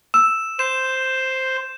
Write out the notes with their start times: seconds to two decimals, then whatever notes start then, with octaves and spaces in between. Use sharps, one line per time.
0.14 E6 E7
0.59 C5 G6 E7